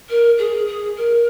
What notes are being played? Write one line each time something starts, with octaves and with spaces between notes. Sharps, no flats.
A#4
G#4
G#4
A#4